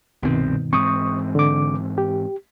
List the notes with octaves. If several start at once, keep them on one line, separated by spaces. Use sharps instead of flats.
C2 G2 B2 D#3 C4
G#2 E3 C4 C#6 D#6
D3 D6
G4